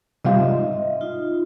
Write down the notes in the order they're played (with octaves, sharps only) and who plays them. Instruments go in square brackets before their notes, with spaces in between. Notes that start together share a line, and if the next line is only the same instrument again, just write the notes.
[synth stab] C3 G3 F4 [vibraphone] D#5 E5
[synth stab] G#2
[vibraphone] D#4 F4